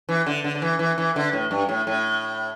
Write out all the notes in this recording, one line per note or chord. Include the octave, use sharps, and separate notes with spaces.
E3
D3
D3
D3
E3
E3
E3
D3
A2
G2
A2
A2